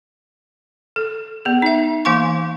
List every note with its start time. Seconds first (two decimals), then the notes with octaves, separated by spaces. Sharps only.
0.96 A4
1.45 B3 G#4
1.62 D#4 E5
2.05 E3 A#3 F5 G#5 C6 C#6